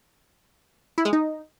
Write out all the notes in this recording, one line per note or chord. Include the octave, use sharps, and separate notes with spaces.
E4
G#3
D#4